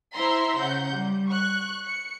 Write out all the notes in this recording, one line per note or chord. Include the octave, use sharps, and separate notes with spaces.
E4 C5 E5 A#5 C6
C#3 F#5 G6
G3
C#6 F#6
C#7